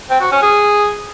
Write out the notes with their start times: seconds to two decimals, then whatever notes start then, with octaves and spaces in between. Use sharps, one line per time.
0.10 C4
0.21 F#4
0.32 C#4
0.42 G#4